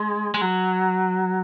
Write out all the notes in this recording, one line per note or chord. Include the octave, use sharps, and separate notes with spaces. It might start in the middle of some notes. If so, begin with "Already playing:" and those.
Already playing: G#3
G#3
F#3